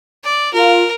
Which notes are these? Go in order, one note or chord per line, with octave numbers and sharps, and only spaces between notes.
D5
F4 A#4